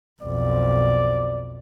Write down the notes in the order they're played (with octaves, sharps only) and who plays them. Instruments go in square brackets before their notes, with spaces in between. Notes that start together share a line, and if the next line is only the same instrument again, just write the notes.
[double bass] B1 F2 [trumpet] D5